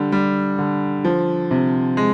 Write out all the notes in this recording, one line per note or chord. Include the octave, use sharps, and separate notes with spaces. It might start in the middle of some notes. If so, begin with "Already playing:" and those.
Already playing: D3 G3
G3
D3
F3
C3
G#3